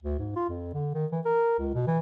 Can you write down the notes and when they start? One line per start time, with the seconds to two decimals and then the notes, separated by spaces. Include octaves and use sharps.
0.03 D2
0.19 G#2
0.36 F4
0.49 F2
0.74 D3
0.95 D#3
1.12 E3
1.25 A#4
1.59 C#2
1.74 B2
1.87 E3